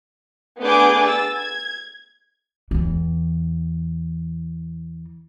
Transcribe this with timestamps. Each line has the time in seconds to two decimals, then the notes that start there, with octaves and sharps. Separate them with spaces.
0.61 A3 B3 D4 G#4 D6 G6
1.03 E6 A6
1.38 G#6
2.71 E2 E3